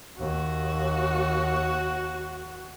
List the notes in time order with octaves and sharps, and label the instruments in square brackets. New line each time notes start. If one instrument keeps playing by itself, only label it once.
[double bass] D#2 [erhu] F#4